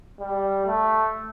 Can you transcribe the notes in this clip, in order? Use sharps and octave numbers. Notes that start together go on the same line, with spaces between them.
G3
A3